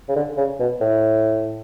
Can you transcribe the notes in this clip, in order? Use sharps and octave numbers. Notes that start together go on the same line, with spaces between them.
C#3
D3
C#3
B2
A2